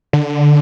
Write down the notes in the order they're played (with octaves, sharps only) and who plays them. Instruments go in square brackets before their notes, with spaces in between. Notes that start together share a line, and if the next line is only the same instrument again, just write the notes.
[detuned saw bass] D3